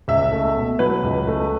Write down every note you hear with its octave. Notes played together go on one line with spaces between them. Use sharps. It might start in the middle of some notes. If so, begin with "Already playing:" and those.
C#2 E5
A3
B2
F#3 B4
C#2
A3